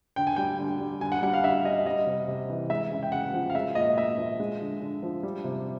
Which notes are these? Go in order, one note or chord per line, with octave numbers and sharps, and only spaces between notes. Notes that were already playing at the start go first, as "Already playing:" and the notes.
D3 G5
G#5
G3 G5
D3
G3
D3 G#5
F#5
G3 F#5
F5
D3 E5
G3 D#5
G3 D#5
C3
C3
E3
G#3 E5
C#3
G5
C#3 F#5
F3
F5
G#3 E5
A#2 D#5
A#2 E5
F3
G#3
D3
D3
F3
G3
C3